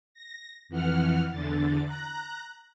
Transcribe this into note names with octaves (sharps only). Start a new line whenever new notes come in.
A#6
F2 E3 F#5 F6
E2 D3 A6
A#5 F#6